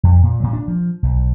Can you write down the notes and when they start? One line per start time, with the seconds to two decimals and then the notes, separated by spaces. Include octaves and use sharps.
0.03 F2
0.23 A#2
0.40 A#2 F#3
0.53 D4
0.68 F3
1.03 B1